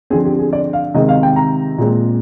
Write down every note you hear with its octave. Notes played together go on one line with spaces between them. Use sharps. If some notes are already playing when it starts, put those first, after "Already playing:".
D3 F3 C4 G#4
G4
G#4
D5
F5
C3 D#3 G#3 C4 D#5
F5
G5
A#5
A#2 G#3 C4